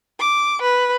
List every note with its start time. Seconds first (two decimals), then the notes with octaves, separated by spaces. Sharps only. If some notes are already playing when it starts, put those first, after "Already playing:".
0.19 D6
0.62 B4